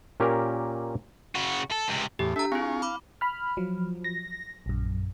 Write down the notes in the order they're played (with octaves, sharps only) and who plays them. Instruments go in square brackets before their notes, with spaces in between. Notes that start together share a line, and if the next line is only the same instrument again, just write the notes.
[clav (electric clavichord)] A#2 C#4 G4 A#4
[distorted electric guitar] C#3 F#4
A4
C#2 C3
[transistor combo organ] E2 A2 [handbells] G4
[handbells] D4 A#5 [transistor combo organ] A4 E5
[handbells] C4 E4 [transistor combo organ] F4 G#4 C#6
[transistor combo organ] F5 [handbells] B5 D6
[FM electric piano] B5 F6
F3 F#3
A#6
A#1 F#2